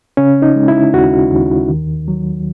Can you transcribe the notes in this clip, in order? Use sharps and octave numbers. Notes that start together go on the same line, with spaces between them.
C#3 C#4
D#4
G#3
E4
D#2 F#4
D#2
D#3
F#3